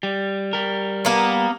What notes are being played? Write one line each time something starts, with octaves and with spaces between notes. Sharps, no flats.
G3
G3 A#4
A#3 B3